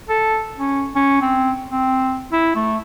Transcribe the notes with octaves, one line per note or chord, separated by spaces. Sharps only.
A4
C#4
C#4
C4
C4
E4
A3